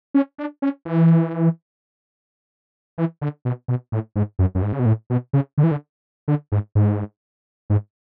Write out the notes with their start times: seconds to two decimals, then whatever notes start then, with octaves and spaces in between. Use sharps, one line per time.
0.14 C#4
0.38 D4
0.62 C#4
0.85 E3
2.98 E3
3.21 D3
3.45 B2
3.68 B2
3.92 A2
4.16 G#2
4.39 F#2
4.55 F#2
4.62 G#2
4.73 C#3
4.79 B2
4.86 A2
5.10 B2
5.33 C#3
5.58 D3
5.64 E3
5.71 D3
6.28 D3
6.52 G#2
6.75 G#2
7.70 G#2